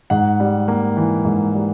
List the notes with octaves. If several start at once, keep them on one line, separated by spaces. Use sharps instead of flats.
G#2 F#5
G3
A#3
E3
G#2
G3